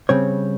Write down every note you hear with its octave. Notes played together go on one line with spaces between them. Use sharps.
C#3 G3 C4 C#5